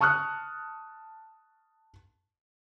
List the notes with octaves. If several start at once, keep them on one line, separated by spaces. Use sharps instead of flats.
A5 C#6 D#6 F6 F#6